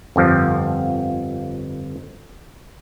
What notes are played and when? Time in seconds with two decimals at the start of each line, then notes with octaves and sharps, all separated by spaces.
0.16 G1 F2 F3